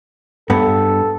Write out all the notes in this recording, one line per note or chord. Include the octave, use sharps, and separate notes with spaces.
G2 B3 A4